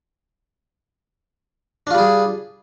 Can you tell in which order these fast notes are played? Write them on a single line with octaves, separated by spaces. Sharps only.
D4 F4 G3 G#4